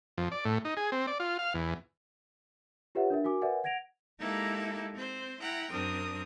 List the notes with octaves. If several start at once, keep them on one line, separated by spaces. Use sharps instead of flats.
F2
D5
A2
D#4
G#4
C4
D5
F4
F5
E2
F4 G4 B4 C#5 E5 F#5
D4 A#4 E5
F#4 A#4 G#5 D6
A#4 B4 D5 E5 F#5 G#5
F#5 G#6 A#6 D7 F7
G#3 A#3 D#4 E4 G4 A4
C4 C5
E4 F#5 G5 A#5
F#2 C4 D4 A#4 D#6